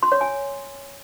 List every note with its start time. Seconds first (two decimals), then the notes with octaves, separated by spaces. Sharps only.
0.03 C6
0.12 C#5
0.21 G#5